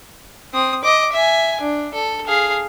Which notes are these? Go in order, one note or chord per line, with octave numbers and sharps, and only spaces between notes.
C4 D#6
D#5 D6
E5 G#5
D4
A4
G#4 F5